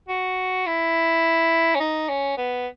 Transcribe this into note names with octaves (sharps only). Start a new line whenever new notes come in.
F#4
E4
C#4
D#4
C#4
B3